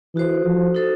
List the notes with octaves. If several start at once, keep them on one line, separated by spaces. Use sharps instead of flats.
E3 D#4 F#4 A4 C5
F3
D#4 F#4 A4 C5